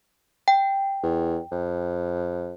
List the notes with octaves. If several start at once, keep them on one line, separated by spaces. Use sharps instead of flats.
G5
E2
F2